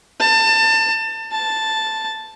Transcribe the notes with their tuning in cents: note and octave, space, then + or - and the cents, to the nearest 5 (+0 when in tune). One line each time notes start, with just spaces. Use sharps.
A5 +25
A5 +0